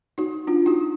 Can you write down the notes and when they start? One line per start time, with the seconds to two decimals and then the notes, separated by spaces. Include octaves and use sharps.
0.18 D#4 F#4
0.47 D4 F4
0.66 D#4 F#4